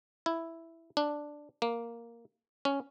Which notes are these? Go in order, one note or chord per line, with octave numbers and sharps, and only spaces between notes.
E4
D4
A#3
C#4